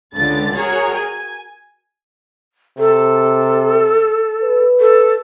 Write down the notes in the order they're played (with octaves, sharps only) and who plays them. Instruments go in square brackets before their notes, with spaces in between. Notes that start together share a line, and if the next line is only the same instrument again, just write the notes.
[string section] C#2 D3 A6
F#4 G#4 A#4 C#5
G#5
[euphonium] C3 [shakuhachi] A4
[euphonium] B4
[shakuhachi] A4